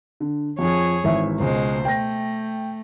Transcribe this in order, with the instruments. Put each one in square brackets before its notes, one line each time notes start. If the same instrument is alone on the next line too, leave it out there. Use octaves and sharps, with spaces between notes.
[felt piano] D3
[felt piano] F2 F3 F4 [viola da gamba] G#4 C#5
[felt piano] G#1 E3 E5
[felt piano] C#2 [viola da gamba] B2 G#3 C5
[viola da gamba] A3 [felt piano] G5 A#6